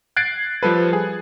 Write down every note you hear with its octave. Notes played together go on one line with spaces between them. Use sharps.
F#6 G#6 A6 C7 D7
F3 G3 A4 B4
G#4